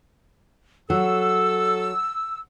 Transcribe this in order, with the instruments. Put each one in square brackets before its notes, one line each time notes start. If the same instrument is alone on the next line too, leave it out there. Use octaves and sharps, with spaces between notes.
[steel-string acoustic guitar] F#3 [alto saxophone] A4 [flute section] E6